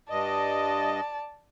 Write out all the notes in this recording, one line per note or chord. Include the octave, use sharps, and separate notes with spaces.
G2 D5 D#5 A5